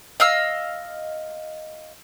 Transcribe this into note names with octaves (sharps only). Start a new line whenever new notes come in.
D#5 F5 E6